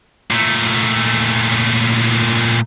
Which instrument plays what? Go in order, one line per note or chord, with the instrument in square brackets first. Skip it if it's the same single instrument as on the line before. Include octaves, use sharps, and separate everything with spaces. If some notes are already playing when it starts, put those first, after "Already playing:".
[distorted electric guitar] A#2 A3